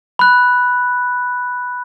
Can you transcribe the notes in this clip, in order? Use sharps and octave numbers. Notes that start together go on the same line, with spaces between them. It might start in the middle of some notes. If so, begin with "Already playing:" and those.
B5 F#6